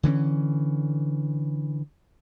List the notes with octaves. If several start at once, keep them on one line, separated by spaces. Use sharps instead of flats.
D3 E3 A3 C#4